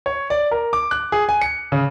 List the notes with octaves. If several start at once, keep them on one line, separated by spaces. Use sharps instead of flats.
C#5
D5
A#4
D6
F#6
G#4
G#5
C#7
C#3